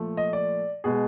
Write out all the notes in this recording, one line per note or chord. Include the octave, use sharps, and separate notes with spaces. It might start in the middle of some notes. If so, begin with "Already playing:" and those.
Already playing: A#2 F3 A3
D#5
D5
B2 G#3 G#4